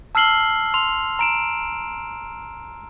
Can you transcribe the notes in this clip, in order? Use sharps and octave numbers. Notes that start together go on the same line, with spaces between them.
A5 E6 F6 C7 F#7 G7
C6 F7
A#5 D7 E7